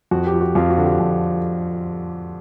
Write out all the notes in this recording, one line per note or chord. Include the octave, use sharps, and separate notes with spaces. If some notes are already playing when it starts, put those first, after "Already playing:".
F2 F#4
G4
F3
F#4
F2 F4
F#4
D3
G4
F2